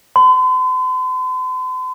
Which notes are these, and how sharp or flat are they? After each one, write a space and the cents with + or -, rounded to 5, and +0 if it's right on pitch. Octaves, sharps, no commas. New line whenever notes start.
C6 -45